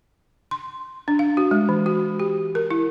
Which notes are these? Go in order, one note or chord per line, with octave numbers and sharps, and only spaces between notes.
C6
D4
F5
F#4
G#3
E3
F#4
G4
A#4
E4